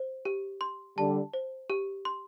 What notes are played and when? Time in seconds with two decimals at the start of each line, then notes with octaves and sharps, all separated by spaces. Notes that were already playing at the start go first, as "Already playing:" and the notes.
Already playing: C5
0.25 G4
0.61 C6
0.97 D3 G3 A5
1.34 C5
1.70 G4
2.05 C6